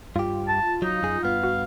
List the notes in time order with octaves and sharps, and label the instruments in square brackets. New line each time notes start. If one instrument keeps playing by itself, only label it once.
[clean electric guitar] G2 G4 [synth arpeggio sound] F4
[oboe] A5
[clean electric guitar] F#3 [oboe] D#4
[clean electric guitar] F#2 G#4
[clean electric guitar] G2 B3 [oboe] F5
[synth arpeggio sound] F#4